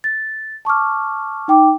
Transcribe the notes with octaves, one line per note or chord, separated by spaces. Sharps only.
A6
A5 C#6 D6 F6
D#4 G5 D6